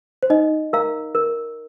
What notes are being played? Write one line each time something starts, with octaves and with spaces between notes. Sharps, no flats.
C5
D#4 D#5
A#4 F5 A#5
A#4